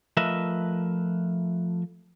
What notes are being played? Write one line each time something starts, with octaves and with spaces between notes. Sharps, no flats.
F3 A3 A#4 B4 D#5 E5